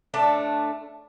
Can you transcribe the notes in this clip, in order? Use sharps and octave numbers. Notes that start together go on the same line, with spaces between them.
A2 A3 D4 A5